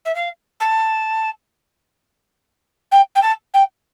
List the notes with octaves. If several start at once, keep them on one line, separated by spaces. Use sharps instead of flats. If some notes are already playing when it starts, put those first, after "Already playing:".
E5
F5
A5
G5
G5
A5
G5